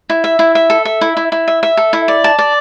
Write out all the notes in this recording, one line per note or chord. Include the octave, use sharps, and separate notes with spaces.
E4
E5
E4
E5
A4
E5
E4
E4
E4
E5
E5
A4
E4
D5
A5
D5